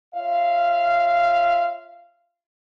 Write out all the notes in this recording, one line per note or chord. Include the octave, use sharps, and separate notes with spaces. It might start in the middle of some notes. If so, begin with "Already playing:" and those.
F4 C#5 E5 F5